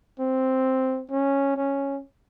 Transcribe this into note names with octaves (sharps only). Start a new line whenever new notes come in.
C4
C#4
C#4